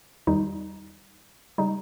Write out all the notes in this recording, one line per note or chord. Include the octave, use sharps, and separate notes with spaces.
E2 D#3 G3 D#4
C#3 G3 D#4